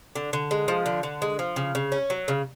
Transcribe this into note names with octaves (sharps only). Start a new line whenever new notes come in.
D3
D3
G#3
F3
D3
D3
G#3
F3
C#3
C#3
C#4
F#3
C#3